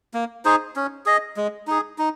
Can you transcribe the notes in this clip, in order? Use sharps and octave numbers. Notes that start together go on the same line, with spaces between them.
A#3
D#4 G#4 C5
C#4
G#4 D#5
G#3
D#4 G#4
D#4